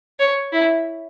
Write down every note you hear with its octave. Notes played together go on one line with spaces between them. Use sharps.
C#5
E4